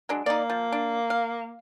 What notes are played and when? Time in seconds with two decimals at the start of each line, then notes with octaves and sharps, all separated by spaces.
0.09 F#3 G#3 D4
0.26 A#3 D#4 D5
0.50 F3
0.72 D4
1.10 F5